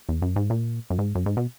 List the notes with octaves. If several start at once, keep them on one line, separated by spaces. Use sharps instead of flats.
E2
F#2
G#2
A#2
F#2
G#2
F#2
G#2
B2